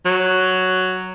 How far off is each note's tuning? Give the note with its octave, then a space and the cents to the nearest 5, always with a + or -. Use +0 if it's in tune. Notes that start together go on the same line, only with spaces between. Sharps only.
F#3 +5